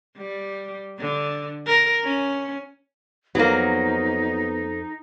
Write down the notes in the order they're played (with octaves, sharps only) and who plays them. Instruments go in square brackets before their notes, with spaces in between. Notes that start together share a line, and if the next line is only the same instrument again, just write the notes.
[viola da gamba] G3
D3
A#4
C#4
[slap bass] F2 [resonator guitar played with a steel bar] F#3 A#3 [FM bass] B3 [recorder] D#4